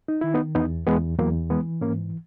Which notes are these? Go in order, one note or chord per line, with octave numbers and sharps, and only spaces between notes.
D#4
D#3 E4
B3 D#4
E2 B3 D#4
E2 G#3 B3
E2 F#3 A#3
E3 G#3 B3
G#2 A#3 C#4